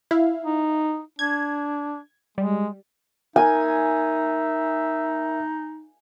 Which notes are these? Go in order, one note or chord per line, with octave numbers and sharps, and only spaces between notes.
E4 F5
D#4
D4 G#6
G3 G#3
D#4 A#4 E5 G#5